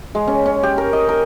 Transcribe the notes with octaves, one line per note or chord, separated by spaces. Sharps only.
G#3
C#4
C#4
G4
A#4
D#5
A#4